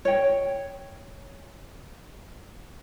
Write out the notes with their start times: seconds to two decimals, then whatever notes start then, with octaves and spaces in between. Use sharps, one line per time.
0.05 C#5 G5